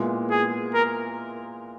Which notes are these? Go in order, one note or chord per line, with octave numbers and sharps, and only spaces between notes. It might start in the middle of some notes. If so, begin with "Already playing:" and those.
Already playing: A#2 G#3 B3 E4
G#4
A#4